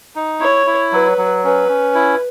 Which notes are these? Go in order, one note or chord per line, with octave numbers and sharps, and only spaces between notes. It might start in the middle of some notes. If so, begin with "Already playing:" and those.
D#4
E4 C#5
E4
F#3 B4
F#3
C#4 B4
C#4
E4